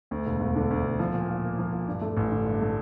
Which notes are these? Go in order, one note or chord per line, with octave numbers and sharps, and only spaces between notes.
D2
E1
E1
D3
D2
E1
F3
A#2
A#2
A#3
F3
A#2
G2
A3
A1
D3
G2
A3